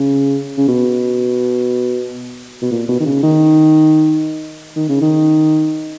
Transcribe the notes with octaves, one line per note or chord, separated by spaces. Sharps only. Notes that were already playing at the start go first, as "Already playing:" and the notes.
Already playing: C#3
C#3
B2
B2
A#2
B2
D#3
C#3
D#3
D#3
C#3
D#3